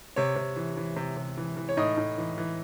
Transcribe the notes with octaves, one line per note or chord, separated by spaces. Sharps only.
C3 C#5
C3
E3
E3
C3
C3
E3
E3
C#5
A2 D#4 D#5
A2
E3
E3